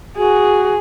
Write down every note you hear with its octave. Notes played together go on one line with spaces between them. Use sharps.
F#4 G#4